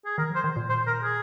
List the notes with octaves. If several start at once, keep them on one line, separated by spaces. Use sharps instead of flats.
G#4
D#3 A#4
F3
C5
D#3
A#2
C5
A#4
G#4